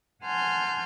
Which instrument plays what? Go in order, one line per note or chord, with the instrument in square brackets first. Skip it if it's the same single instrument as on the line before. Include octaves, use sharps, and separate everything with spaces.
[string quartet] F#5 G#5 A5 C6 F6 G6